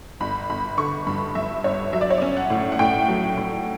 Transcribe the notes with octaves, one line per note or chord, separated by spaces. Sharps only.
G1 B5
G1 B5
D3 C#6
G2 B5
G2 E5
G1 C#5
F#3 E5
D5
C#5
C#4 D5
F#5
A2
F#5
A2 G5
F#3
A2